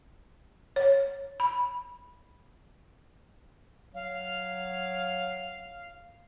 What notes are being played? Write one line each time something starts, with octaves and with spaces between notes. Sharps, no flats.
C#5
B5
F#3 F5